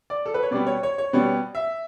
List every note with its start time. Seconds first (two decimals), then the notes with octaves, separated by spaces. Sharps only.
0.10 D5
0.26 A4
0.34 B4
0.43 C#5
0.51 B2 G3 B3 D5
0.67 C#5
0.83 C#5
0.98 C#5
1.13 B2 G3 B3 C#5
1.55 E5